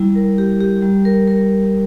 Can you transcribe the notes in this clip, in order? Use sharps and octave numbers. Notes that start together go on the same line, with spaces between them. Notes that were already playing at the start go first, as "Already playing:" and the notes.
Already playing: G3 E4
A#4
G4
G4
G3
A#4
A#4